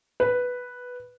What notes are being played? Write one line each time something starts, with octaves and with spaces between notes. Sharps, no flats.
B4